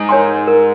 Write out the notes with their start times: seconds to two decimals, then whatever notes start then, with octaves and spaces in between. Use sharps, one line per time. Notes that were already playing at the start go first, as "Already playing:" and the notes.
Already playing: G#2
0.09 A#4 C#5 G#5 C6
0.48 A#4